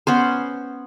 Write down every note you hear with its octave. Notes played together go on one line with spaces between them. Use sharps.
B3 C#4 C5